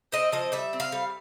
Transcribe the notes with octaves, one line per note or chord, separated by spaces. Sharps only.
C4 D#5
F3 D#5
G3 E5
C4
F5
G3